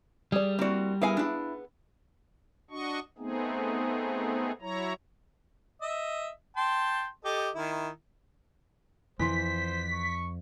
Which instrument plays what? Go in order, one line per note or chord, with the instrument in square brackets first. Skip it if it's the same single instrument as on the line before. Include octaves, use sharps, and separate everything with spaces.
[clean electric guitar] G3 [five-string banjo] G#4 D5
[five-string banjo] A#3 E4 D5 [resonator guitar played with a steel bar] C4 F#4
[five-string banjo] B3 G#4 F5 [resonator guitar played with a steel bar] E4 A#4 G#5
[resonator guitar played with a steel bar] D4 E4
[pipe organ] D4 F#4 D#5 C#6
A3 B3 C4 D#4 G#4
F#3 E4 C#5 A#5
[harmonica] D#5 E5
G5 A5 C6
G4 A4 D#5
D#3 E4
[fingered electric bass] F2 [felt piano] E3 C6 [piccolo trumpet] C5 [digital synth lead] B6
[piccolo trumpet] C#6